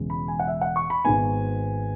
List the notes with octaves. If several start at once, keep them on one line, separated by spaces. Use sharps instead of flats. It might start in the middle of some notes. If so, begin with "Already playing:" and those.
Already playing: E1 E2 C#3 G#3
B5
G#5
F#5
E5
F#5
C#6
B5
G#1 G#2 G#3 B3 G#5